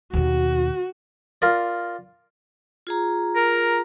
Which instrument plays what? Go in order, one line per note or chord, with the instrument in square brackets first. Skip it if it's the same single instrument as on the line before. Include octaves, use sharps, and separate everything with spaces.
[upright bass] D#2 B2 [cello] F#4
[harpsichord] F4 A#4 D5
[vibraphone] F4 G#4 A#5
[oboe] A#4